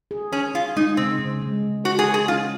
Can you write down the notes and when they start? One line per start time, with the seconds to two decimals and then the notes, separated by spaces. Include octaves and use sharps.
0.11 G#4
0.32 C#4 G#4
0.54 F4 G#4
0.76 G#3 D#4
0.97 C#3 C4
1.19 C#3
1.42 G#3
1.63 C#3
1.84 F#4 C5
1.99 G#4
2.07 C5
2.14 G#4
2.28 C#4 F4